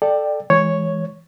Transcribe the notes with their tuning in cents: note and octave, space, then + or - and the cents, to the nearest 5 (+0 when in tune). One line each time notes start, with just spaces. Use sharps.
A4 +0 D5 +20 G5 +0
E3 +0 G#3 +0 C#5 +0